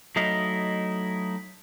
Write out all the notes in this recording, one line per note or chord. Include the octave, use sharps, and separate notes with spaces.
F#3 A3 D#4 E4 D#5 F5